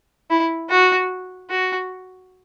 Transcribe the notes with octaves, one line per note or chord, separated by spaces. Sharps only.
E4
F#4
F#4